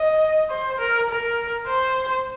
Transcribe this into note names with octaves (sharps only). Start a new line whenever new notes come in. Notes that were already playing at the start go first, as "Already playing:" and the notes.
Already playing: D#5
C5
A#4
A#4
C5